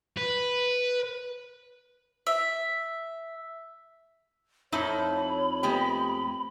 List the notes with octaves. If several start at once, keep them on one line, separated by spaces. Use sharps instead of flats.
B4
E5
F2 A3 D#4 E4 C#5 B5
G#3 A3 B3 G4